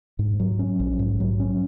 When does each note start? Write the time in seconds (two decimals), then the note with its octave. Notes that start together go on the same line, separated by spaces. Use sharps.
0.19 G#2
0.40 F#3
0.59 C#4
0.80 A#1
0.99 G#2
1.20 F#3
1.40 C#4